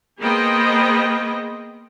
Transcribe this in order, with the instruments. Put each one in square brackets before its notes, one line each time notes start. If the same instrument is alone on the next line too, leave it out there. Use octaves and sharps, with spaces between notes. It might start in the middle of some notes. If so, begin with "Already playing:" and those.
[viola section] A#3 B3 G#4 C5 D#5 G5